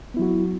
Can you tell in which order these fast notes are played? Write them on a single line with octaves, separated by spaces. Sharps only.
B3 E4 F#3 F#4